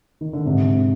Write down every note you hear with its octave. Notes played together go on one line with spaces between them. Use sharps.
D#3
D3
G#2 C3